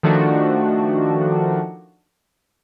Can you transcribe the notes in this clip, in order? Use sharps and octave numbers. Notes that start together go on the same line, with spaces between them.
D#3 F3 A3 D4 F#4